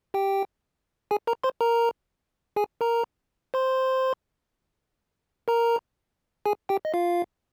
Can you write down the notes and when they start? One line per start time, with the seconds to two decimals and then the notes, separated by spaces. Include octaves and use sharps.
0.14 G4 G5
1.11 G#4 G#5
1.27 A#4 A#5
1.44 C5 C6
1.61 A#4 A#5
2.56 G#4 G#5
2.81 A#4 A#5
3.54 C5 C6
5.48 A#4 A#5
6.46 G#4 G#5
6.69 G4 G5
6.85 D#5
6.94 F4 F5